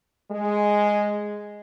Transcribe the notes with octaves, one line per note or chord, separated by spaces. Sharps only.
G#3